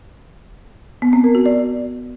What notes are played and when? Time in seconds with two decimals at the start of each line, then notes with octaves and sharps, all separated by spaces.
1.02 B3
1.13 C4
1.24 A#4
1.35 F#4
1.46 D5